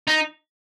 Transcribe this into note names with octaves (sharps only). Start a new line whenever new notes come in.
D#4